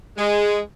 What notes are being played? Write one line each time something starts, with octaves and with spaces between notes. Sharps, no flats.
G#3